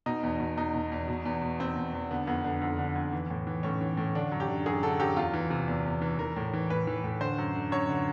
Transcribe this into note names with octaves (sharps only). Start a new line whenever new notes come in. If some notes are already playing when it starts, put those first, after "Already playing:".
B2 D#4
E2
B2
E2 D#4
B2
E2
B2
E2
B2
E2 C4
B2
E2
D3 B3
F2 B3
D3 B3
F2
D3
F2
E3
A2
E3
A2 C#4
E3
A2
D3 D4
F#2
G4
D3
F#2 G#4
D3 A4
F#2 G4
E2 F4
E3
C3
E2
E2
E3
E3 A#4
A2
E3
A2 B4
E3
A2
D3 C5
F#2
D3
F#2 C#5
D3